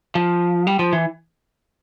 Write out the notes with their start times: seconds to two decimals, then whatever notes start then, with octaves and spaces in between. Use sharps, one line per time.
0.15 F3
0.67 G3
0.79 F3
0.93 E3